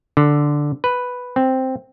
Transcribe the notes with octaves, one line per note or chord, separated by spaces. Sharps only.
D3
B4
C4